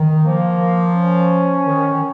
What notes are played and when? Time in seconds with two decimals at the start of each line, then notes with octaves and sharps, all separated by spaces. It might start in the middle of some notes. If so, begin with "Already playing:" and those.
Already playing: D#3
0.26 F3 A#3
0.95 C#4
1.66 D#3
1.93 D#3